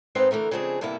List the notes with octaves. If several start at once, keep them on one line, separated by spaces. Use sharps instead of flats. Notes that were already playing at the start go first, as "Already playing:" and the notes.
G#2 C4 D#4 B4 C5 F5
D3 E3 A3 A#4
C#3 F3 G#3 C4 D4 G#4
G2 C3 A#3 B3 E4